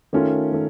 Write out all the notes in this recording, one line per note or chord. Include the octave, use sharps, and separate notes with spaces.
D#3 A3 C#4 F4
D#3 A3